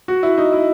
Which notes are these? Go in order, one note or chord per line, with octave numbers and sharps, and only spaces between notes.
F#4
E4
D#4
E4